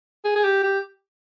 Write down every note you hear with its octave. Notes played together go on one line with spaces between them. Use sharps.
G#4
G#4
G4
G4